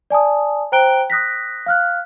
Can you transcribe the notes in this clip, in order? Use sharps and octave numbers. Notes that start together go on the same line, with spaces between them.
D5 G#5 A5 D#6
C5 G5 A#5 F#6 D7 G7
D#6 F#6 A#6 B6
F5 F6 F#6